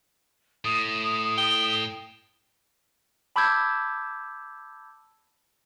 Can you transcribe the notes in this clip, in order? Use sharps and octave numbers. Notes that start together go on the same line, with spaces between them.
A2 D#6
G5
A5 B5 D6 E6 G6 G#6